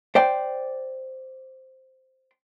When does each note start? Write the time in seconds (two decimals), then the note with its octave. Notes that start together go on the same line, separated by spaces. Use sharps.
0.15 C5 D5 G5